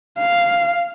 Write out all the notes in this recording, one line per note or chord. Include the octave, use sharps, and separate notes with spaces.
F5